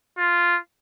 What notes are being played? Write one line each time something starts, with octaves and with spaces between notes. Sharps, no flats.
F4